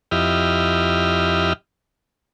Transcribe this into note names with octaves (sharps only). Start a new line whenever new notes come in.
F2 E4 G4 D#5 F6